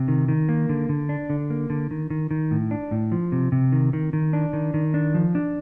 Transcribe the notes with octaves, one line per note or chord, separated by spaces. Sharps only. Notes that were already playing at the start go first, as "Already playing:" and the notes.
Already playing: C3
D#3
D#3
A#3
D3
D3
D4
D3
A#3
D3
D#3
D#3
D#3
A2
D4
A2
F3
C3
C3
D#3
D#3
D#3
D4
D#3
D#3
D4
F3
D4